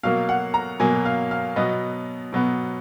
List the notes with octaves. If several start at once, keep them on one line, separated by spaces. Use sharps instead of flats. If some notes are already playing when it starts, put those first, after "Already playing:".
B2 F#3 A#3 F5
F#5
A#5
B2 F#3 A#3 G#5
F5
F5
B2 F#3 B3 D#5
B2 F#3 B3